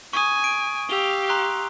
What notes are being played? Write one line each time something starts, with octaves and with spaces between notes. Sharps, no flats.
G#5 C#6 D#6
D7
G4 F5 E6 F7 G7
A#5 C6 F#6